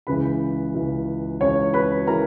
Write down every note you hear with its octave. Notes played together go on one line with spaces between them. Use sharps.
C#2 C#3 E3 B4 B5
C#2 C#3 E3
C#2 C#3 E3 C#5 C#6
B4 B5
C#3 E3 A#4 A#5